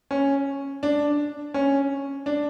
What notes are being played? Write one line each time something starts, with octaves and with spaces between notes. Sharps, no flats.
C#4
D4
C#4
D4